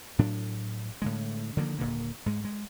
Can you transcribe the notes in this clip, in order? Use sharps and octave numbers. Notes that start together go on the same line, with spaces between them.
A2 F#3 D4
A2 D3 G#3
D3 D#3 F3 A#3
D#1 A#2 D3 A#3
G#2 G#3
G#3